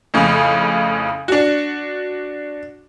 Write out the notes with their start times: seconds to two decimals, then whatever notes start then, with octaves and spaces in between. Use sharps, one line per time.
0.14 F2 A2 C#3
1.28 D4 F#4